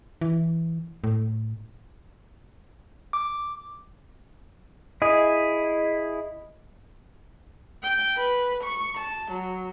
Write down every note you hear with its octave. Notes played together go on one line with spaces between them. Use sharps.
E3
A2
D6
E4 G#4 D#5
G5
B4
C#6
A5
F#3